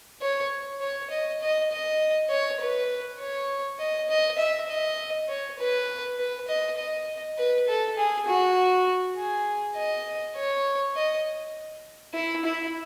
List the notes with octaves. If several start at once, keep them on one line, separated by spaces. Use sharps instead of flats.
C#5
C#5
D#5
D#5
D#5
C#5
B4
C#5
D#5
D#5
E5
D#5
C#5
B4
B4
D#5
D#5
B4
A4
G#4
F#4
G#4
D#5
C#5
D#5
E4
E4